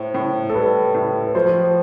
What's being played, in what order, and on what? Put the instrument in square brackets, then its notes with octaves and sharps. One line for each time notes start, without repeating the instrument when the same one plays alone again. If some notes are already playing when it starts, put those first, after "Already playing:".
Already playing: [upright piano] A2 [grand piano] C5
[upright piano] A2
[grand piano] A4
[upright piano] G3 [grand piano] B4
[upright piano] A2
[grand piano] B4
[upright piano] F3 [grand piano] C5